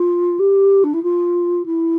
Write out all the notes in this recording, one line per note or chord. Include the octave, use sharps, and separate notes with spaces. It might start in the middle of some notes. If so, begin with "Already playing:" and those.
Already playing: F4
G4
D4
E4
F4
E4